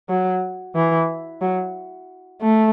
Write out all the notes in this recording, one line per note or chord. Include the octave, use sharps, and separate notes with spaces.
F#3
E3
F#3
A3